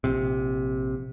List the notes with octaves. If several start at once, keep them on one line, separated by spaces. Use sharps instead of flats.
A#1 C3